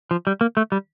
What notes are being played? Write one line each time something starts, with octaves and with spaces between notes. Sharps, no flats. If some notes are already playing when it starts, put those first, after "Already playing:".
F3
G3
A#3
A3
G3